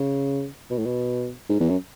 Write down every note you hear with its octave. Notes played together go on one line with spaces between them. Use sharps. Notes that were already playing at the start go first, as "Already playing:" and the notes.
Already playing: C#3
B2
A2
B2
G#2
E2
F#2